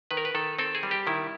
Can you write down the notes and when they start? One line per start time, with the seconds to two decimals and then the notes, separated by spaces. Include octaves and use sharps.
0.11 D#3 B4
0.17 A#4
0.25 B4
0.35 D#3 A4
0.59 C4 A4
0.75 G#4
0.83 G3
0.91 G4
1.07 D#3 E4